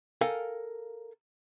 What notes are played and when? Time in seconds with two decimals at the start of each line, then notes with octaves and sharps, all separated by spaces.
0.21 A4 A#4 F5 G5 G#5